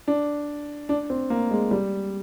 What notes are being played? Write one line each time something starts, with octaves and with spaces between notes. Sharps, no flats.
D4
D4
C4
A#3
G#3
G3